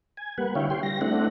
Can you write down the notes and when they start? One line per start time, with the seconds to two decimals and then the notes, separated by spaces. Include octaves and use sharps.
0.17 G#5
0.38 G3 A#3 B4 F#5
0.55 D3 E4 C#5 F5 G5
0.70 G4 G5 C6
0.83 G3 A#6
1.01 A3 C4 D4 E4 F#5